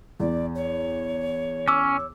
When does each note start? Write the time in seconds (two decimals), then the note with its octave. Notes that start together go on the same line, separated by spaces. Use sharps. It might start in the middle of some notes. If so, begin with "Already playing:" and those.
0.20 E2 D5
0.55 C#5
1.68 C#4 D6 E6